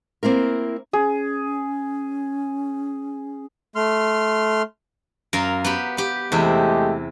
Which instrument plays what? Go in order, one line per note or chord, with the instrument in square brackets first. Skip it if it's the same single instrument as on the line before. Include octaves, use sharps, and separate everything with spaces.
[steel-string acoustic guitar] A#3 C4 E4 A#4
[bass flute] C#4 [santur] G#4
[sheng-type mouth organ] A3 C6 F6
[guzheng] F#2 A#4 F5
B3 G4 B5
G4 B4
[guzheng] E2 C3 E4 [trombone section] G#3 A3 G4